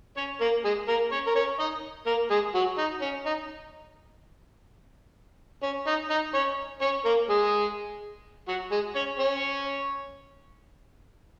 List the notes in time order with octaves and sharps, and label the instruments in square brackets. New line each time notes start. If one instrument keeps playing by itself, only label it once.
[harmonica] C#4 C#5
A#3 A#4
G#3 G#4
A#3 A#4
C#4 C#5
A#4
C#4 C#5
D#4 D#5
A#3 A#4
G#3 G#4
F#3 F#4
D#4
C#4
D#4
C#4
D#4
D#4
C#4 C#5
C#4 C#5
A#3 A#4
G#3 G#4
F#3 F#4
G#3 G#4
C#4 C#5
C#4 C#5